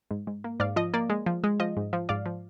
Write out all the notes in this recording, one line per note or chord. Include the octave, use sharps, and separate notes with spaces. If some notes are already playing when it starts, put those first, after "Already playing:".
G#2
G#2
A#3
G#2 D5 F5
F3 D#5
A#3 D5
G#3
F3
G#3
F3 D#5
G#2
F3
G#2 D5 F5
F3